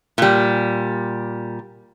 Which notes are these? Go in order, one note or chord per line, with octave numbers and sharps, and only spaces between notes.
A#2 G3